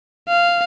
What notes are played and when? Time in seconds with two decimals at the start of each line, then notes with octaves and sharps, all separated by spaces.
0.28 F5